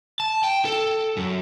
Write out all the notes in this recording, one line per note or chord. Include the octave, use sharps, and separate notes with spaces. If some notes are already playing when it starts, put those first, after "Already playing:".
A5
G5
A4
F#2